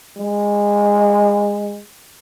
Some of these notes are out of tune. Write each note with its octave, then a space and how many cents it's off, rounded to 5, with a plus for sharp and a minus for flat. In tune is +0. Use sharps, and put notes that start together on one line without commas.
G#3 -20